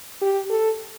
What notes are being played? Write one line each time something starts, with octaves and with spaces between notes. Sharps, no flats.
G4
A4